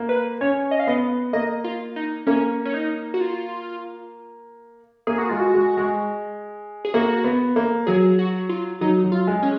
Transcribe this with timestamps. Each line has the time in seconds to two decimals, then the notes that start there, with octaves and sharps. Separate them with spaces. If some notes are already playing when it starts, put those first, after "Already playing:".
Already playing: A#3
0.09 B4
0.41 C#4 C#5
0.71 D#5
0.80 F5
0.87 B3 D#5
1.33 A#3 D#5
1.64 F4
1.96 D#4
2.27 A#3 C#4
2.65 C#4
2.74 D#4
3.14 F#4
3.20 F4
5.07 A#3 G#4
5.18 F#4
5.29 G#3 F4
5.40 F#4
5.54 G#3
5.77 G#3
6.85 G#4
6.94 A#3 F#4
7.24 B3
7.56 A#3
7.87 F#3 G#4
8.19 F#4
8.49 F4
8.81 F#3 D#4
9.04 F#3
9.12 F4
9.27 G#3
9.43 C#4